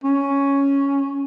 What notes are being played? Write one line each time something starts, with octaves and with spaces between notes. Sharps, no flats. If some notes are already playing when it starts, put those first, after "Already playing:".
C#4